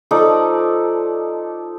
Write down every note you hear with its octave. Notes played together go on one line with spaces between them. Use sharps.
F3 D#4 A4 D5